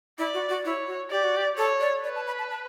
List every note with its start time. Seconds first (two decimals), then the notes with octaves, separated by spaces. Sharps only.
0.18 E4 D5
0.34 F#4
0.49 F#4
0.65 E4 C#5
0.87 F#4
1.11 G4 D5
1.24 F#4
1.37 G4
1.57 A4 C#5
1.80 D5
2.04 B4 D5
2.15 A5
2.27 B5
2.39 A5
2.50 A5